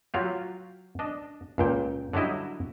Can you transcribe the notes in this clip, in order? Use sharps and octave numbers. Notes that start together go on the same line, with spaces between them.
F#3 F4 G4
D4 D#5
C#2 A#2 G5
D3 F#3 G3 E4 D#5